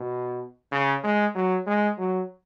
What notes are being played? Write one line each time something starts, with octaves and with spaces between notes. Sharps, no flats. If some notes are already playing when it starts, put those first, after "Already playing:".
Already playing: B2
C#3
G#3
F#3
G#3
F#3